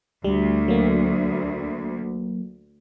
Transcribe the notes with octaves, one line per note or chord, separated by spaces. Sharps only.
D2 G3
F#3 A#3